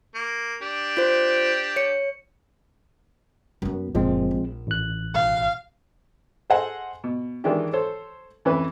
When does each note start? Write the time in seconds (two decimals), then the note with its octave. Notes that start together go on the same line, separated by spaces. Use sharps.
0.15 A#3
0.62 D4 G4
0.97 F4 C5
1.76 C#5 C#7
3.62 F#2 B3
3.95 F#1 A#2 F3 G#3 C4
4.31 A#1
4.67 A1 F#6
5.14 B1 F5
6.50 G#4 A4 C5 D#5 F#5 G#5
7.04 B2
7.44 D#3 E3 G#3 D4 G4
7.73 A4 C5 C#5
8.45 F2 E3 C#4 B4